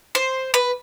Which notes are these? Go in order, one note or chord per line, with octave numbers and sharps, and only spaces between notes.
C5
B4